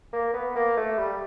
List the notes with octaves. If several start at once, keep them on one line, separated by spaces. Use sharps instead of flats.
A#3
B3
A#3
A3
G3